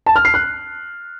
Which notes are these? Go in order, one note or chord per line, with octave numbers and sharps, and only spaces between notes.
A5
F6
C7
F#6